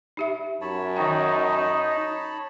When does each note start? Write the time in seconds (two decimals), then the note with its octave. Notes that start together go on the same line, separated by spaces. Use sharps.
0.17 D#4 G4 E5
0.61 F#2 C#5 A5 B5
0.96 D#3 D#4 G5